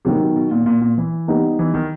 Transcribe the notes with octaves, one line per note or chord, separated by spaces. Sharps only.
C3 D#3 F#3 B3
B2
B2
A#2
A#2
A#2
E3
G3 B3 D#4 G4
E3
D#3